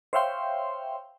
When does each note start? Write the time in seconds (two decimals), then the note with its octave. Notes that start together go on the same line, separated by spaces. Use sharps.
0.13 C5 C#5 E5 F5 G5 C6